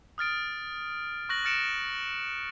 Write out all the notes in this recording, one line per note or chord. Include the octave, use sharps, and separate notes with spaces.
D#6 F6 A6 D7
C#6 F#6 A#6 F#7
F6 A6 C#7 D7 E7